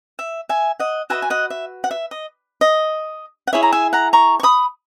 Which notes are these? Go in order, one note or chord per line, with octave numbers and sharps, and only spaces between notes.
E5
E5 G#5
D#5 F#5
F#4 B4 D#5 E5 G#5
G#5
D#5 F#5
E5
F#5
E5
D#5
D#5
F#5
E4 G#4 C#5 E5
A#5
E5 G#5
F#5 A#5
A#5 C#6
C#6
B5 D#6